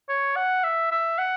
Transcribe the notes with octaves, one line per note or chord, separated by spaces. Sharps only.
C#5
F#5
E5
E5
F#5